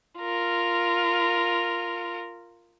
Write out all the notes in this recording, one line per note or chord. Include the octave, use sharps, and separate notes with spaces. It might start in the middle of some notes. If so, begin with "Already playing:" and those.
F4 A#4